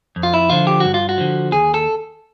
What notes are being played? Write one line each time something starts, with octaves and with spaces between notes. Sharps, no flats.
F2
F4
E4
D3 F3 F4
G4
G2 F#4
F4
F#4
D3 F3
D#2 G#4
A4